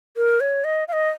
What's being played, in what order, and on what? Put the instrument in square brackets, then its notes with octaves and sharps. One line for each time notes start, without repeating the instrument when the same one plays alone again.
[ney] A#4
C#5
D#5
F5
D#5